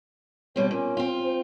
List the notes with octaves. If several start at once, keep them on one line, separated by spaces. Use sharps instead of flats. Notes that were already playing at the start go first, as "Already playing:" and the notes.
B2 G3 C4 C#5
A#2 C#4
C4 F4
C5